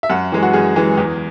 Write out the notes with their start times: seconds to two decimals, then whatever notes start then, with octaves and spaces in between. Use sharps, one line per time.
0.03 E5
0.10 F#2 F#5
0.32 E3 G#3
0.43 F#4
0.53 F#2 G#4
0.76 E3 G#3
0.98 E2